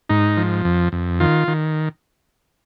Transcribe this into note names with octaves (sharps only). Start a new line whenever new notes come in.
G#2 D#4
F3
F2
F2
D#3 F4
D#3